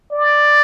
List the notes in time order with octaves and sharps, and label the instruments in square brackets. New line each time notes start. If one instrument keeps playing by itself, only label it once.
[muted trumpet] D5